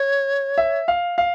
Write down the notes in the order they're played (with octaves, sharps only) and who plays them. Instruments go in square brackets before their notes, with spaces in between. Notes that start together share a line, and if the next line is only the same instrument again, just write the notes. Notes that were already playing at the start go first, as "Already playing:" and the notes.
Already playing: [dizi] C#5
[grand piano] E5
F5
F5